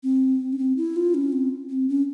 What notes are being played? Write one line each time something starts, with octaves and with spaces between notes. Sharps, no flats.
C4
C#4
C4
E4
F4
C#4
C4
C4
C#4